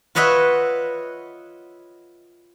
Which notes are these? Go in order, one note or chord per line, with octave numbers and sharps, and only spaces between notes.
F4 B4 C#5 D#5 E5 F#5